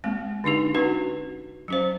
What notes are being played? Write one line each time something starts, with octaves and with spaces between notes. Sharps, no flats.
G#3 A#3 C4
D3 D4 D#4 G4
C#4 D#4 F#4 B4 F#5
F#3 C#4 C5